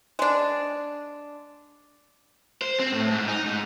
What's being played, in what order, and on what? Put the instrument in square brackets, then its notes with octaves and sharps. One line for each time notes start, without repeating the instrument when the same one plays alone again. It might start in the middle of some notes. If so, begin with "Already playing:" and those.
[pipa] G#3 D4
[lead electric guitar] C5
C4
A2
G#2
D#4
G#2